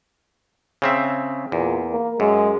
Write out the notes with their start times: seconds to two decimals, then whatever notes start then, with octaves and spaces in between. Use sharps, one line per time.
0.82 C#3 C4 E5
1.52 E2 A#2
1.91 A#3
2.20 F#2 G#3